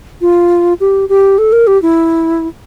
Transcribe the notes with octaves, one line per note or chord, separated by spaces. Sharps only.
F4
G4
G4
A4
A#4
G4
E4